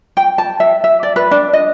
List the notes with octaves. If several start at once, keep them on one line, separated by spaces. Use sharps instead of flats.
G5
A5
E5
E5
D5
B4
D4
D#5